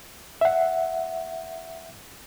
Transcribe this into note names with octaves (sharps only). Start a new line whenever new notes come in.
E5 F#5